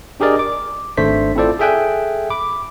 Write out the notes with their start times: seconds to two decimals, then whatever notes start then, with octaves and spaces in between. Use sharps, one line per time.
0.20 D4 G4 G#4 A#4 D5 D#5
0.39 D6
0.97 G#1 A3 D4 C5 B6
1.36 C4 E4 F4 A4 C5 D5
1.59 G#4 A4 E5 G5 G#5 F#6
2.30 B5 D6